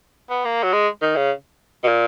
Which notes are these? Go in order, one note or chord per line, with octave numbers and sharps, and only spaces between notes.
B3
A#3
F#3
G#3
D#3
C#3
B2
A#2